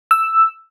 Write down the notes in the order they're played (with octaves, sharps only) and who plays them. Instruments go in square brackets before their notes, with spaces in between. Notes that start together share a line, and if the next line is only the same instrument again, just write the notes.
[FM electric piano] E6